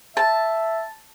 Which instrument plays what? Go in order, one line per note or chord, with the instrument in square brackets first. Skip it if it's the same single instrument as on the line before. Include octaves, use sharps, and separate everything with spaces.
[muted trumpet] E5 [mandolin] A5